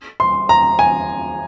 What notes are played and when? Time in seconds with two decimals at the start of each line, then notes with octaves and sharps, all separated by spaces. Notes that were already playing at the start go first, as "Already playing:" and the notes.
0.20 C6
0.49 A#5
0.79 G#5